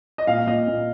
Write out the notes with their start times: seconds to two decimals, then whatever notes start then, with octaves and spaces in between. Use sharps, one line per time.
0.18 D#5
0.27 A#2 F5
0.47 A#2 D#5
0.67 A#2